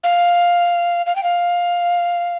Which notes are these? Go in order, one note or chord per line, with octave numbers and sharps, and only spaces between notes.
F5
F5
G5
F5